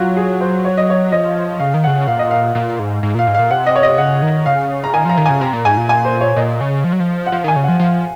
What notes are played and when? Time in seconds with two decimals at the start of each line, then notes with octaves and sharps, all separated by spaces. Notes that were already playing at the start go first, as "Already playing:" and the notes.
Already playing: F#3 F4 F#4
0.17 G#4
0.41 C5
0.65 C#5
0.77 D#5
0.90 C#5
1.12 F3 D#5
1.59 C#3 F5
1.74 D#3
1.84 C#3 F#5
2.07 A#2 F5
2.19 D#5
2.31 F5
2.55 A#2 F5
2.79 G#2
3.03 G#2
3.15 A#2 F5
3.27 G#2
3.35 A#2 F5
3.51 C3 F#5
3.66 D#5
3.76 C#5
3.83 D#5
3.98 C#3 F#5
4.22 D#3
4.46 C#3 F5
4.84 A#5
4.94 D#3 G#5
5.05 F3 A#5
5.17 D#3
5.26 C#3 G#5
5.41 C3 A#5
5.53 A#2
5.65 G#2 G#5
5.77 A#2
5.89 G#5
6.05 C5
6.21 C#5
6.36 A#2 D#5
6.61 C#3
6.84 F3
6.92 F#3
7.00 F3
7.26 F#5
7.32 F3 F5
7.44 D#3 G#5
7.56 C#3
7.64 F3 F#5
7.79 F3 F5